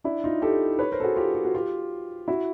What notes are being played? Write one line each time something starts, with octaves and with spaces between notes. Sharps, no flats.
D4 E4
D#4 F4
G4 A4
B4 C#5
A#4 C5
A4
F#4 G#4
F4 G4
G4
F#4
F4 G4
E4 F#4